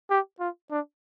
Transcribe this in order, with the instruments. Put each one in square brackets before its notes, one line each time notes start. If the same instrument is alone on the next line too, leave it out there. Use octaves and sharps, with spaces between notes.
[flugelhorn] G4
F4
D4